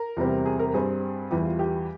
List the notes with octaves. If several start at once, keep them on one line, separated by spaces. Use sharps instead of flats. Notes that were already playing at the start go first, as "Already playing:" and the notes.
Already playing: A#4
E2 C3 G3 C4
G#4
A#4
G2 G3 C4 G#4
E2 E3 G3 G4
F4
G4